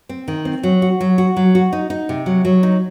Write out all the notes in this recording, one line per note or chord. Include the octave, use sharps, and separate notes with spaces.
C4
D#3
C4
F#3
F#4
F#3
F#4
F#3
F#4
D#4
D#4
C3
F#3
F#3
D#4